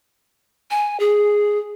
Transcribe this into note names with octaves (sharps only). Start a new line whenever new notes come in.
G#5
G#4